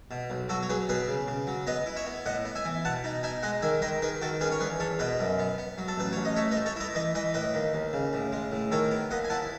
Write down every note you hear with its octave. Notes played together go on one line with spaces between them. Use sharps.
B2
B1
F#3 F#4 A4
C#5
F#3 G#4 B4
B2 G#4 B4
C#3
C#3
F#3
B3 B4 D#5
E4
C#5 E5
B3
A2 D#5 F#5
B3
E5 G#5
E3
B2 F#5 A5
D#4
D#4 E5 G#5
G#3 D#5 F#5
D#3 E5 G#5
D#3 B4 D#5
D#3 G#4 B4
D#3 F#4 A4
C#4 G#4 B4
C#5
E2 G#4 B4
E2 A4 C#5
B2 B4 D#5
F#2
B3
B3
F#3
A4
A1 B4
A1 C#5
D#5
A3 C#5 E5
B4 D#5
A3
A4 C#5
E4 B4 D#5
E3 B4 D#5
E3 B4 D#5
A2 B4 D#5
D#2
D#2
C#3
A2
G#3
A2
D#3 A4 C#5
B3
D#2 D#5 F#5
G#5
E4 F#5 A5